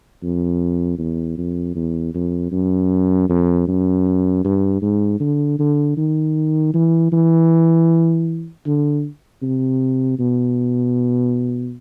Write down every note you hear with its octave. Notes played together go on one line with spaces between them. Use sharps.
F2
E2
F2
E2
F2
F#2
F2
F#2
G2
G#2
D3
D3
D#3
E3
E3
D3
C3
B2